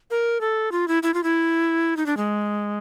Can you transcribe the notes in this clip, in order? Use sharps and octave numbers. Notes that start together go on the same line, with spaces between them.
A#4
A4
F4
E4
E4
F4
E4
D#4
D4
G#3